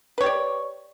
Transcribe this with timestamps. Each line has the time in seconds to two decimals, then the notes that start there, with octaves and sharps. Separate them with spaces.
0.18 B4
0.21 C#5
0.23 G4
0.26 D5